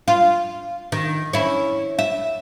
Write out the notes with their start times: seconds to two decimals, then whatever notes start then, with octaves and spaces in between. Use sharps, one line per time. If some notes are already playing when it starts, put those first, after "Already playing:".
0.08 F4
0.92 D#3
1.33 C#4 E4
1.99 E5